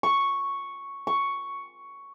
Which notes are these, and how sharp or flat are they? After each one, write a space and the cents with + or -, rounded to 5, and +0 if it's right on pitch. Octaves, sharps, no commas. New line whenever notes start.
C#6 +0
C#6 +5